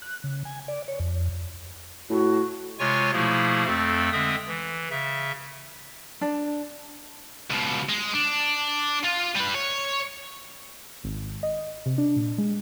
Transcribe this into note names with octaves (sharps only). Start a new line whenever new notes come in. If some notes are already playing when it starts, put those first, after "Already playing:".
F#6
C#3
G#5
D5
C#5
F2
A2 F#4
C3 G#3 F4 C#5 G#5 C#6
B2 F3 A3 A#3 E4 G#4
F2 A3 C4 A4
D3 G#3 C4 E5 D#6
E3
C#3 E5
D4
C#2 B2
G#3
D4
F4
G3 B4
C#5
G#1
D#5
C3
D4
A#2
G#3